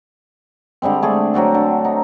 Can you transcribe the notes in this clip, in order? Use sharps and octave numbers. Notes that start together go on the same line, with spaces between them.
D3 G3 G#3 C4
A3 G#4 D5
F#3 C4 F#4 A4
D3
D#4